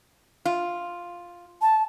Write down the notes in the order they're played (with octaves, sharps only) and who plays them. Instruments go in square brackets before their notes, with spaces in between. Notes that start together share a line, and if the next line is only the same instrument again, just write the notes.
[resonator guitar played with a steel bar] F4
[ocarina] A5